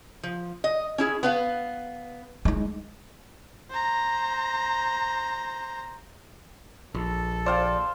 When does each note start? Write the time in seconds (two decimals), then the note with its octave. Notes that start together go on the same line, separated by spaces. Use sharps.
0.23 F3
0.64 D#5
0.98 C#4 E4 G#4
1.23 B3 B4 F5
2.45 G#3 D#4
3.70 C5 A#5
6.95 A#1 A4
7.46 C5 D5 F5 G5